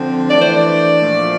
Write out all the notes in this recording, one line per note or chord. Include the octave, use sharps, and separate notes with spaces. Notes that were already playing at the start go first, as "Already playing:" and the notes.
Already playing: D3 F3 C4
E3 A3 D4 D5
C5
D5
A#2 F3 A3